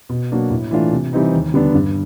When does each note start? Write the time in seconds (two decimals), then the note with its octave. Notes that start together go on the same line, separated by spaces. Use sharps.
0.09 B2
0.31 F#3 A#3 D4 F#4
0.50 A2
0.71 E3 A3 D4 F4
0.92 C3
1.13 E3 G3 C4 D#4
1.32 D#2
1.54 D3 G3 B3 D4
1.75 G2